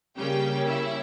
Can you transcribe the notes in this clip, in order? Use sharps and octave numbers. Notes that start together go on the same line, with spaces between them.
C#3 G3 A#3 C#4 G4 G5
E4 E5